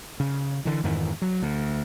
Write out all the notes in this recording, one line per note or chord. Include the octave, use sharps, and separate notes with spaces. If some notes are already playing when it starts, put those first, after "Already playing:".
C#3
D3 E3
F2 G#2 D#3 E3
F#3
D2